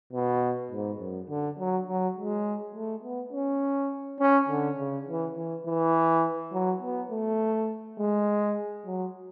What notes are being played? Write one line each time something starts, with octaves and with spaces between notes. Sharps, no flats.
B2
G#2
F#2
D3
F#3
F#3
G#3
A3
B3
C#4
C#4
D3
C#3
E3
E3
E3
F#3
B3
A3
G#3
F#3